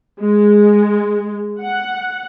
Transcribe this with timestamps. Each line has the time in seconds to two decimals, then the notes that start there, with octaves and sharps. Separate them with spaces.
0.21 G#3
1.62 F#5